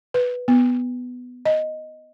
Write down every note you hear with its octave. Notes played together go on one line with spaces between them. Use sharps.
B4
B3
D#5